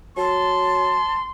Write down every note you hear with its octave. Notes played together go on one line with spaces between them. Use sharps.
F#3 A5 C6